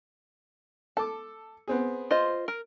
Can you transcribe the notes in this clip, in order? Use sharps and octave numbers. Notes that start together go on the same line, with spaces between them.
A4 A5 D6
B3 C4 G#4
F4 C5 D#5
A#4